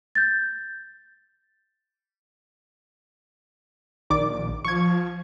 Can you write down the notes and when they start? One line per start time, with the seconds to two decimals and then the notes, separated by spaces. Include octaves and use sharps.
0.15 G6 A6
4.10 A#1 D#3 D5 D6
4.65 F3 C#6 G#6